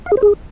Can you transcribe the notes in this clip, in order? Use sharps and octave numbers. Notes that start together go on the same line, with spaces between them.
F5
G#4
C5
G#4